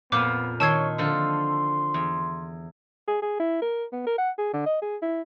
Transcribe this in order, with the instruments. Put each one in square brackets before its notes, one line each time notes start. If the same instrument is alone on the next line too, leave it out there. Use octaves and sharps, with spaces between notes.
[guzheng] F2 A#2 F3 [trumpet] B3 [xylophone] D6
[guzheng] D#3 C6 [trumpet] C#5 [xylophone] A5 E6 G#6
[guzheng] D3 F3 A4 [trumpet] C6
[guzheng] E2
[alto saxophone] G#4
G#4
E4
A#4
B3
A#4
F#5
G#4
D3
D#5
G#4
E4